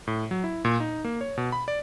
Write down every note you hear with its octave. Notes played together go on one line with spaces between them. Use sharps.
A2
F#3
E4
A#2
D#4
A#3
C#5
B2
B5
D5